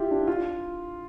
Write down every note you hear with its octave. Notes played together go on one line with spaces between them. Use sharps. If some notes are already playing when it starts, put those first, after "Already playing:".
Already playing: E4 F4 G4
D4
F4